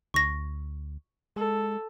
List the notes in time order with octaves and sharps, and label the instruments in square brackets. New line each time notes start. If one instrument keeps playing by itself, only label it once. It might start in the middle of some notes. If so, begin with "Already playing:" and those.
[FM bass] D2 [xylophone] C#6 A#6
[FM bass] G#3 [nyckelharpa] A4